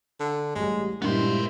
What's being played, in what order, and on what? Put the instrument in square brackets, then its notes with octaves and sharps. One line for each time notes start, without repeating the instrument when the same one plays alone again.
[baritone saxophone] D3
[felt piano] A1 G3 [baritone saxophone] G#3
[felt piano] G2 G3 [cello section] A#2 G#3 E4 [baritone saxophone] D#3 [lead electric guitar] B3 C5